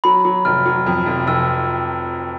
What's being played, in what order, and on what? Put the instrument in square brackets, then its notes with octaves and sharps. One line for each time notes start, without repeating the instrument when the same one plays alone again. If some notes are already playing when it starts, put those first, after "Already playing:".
[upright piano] F#3 [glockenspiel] B5
[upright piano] F#3
[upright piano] F1 [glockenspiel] F6
[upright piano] F#3
F2
F1
[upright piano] F1 [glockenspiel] E6